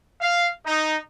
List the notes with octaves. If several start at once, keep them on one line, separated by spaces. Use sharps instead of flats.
F5
D#4